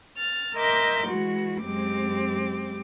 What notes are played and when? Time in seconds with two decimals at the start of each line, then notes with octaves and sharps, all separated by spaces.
0.16 F6 A6
0.56 A#4 D#5 E5 C6 D6 G6
1.07 E3 G#3 F#4
1.64 F#2 G#3 C4 G4 D6